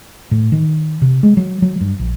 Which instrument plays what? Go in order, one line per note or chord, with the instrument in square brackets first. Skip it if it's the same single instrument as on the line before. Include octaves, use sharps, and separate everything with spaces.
[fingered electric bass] A2
D#3
C3
G#3
F#3
F#3
G2
A#1